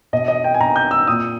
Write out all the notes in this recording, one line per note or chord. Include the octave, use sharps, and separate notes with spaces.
B2 D#5
D#5
G5
G#5
B2 A#5
G6
E6
A#2 D#6